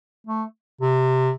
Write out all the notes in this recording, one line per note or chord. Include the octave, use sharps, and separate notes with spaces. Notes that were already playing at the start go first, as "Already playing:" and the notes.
A3
C3